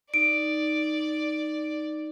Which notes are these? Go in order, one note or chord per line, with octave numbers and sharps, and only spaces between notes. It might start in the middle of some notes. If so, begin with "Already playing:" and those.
D#4 D5 D7